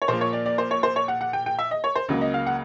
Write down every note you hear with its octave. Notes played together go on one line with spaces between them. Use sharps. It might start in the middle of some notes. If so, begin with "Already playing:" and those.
C#5
A#2 F3 A#3 C5
C#5
D5
D5
C5
C#5
C5
C#5
F#5
F#5
G5
G5
E5
D#5
C#5
C5
C#2 C#3 F#3 A#3
D#5
F5
F#5